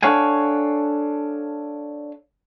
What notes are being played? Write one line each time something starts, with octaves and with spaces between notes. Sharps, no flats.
D4 A4 C#5 F5 F#5 G#5